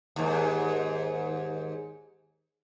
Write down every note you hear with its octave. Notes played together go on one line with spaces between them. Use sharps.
D#2 G#2